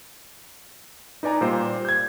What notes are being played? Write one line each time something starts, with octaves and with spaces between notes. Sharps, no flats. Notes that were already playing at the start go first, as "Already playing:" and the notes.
D#4 B4 D5 G#5 A#5
A#2 G3 C5
G6 G#6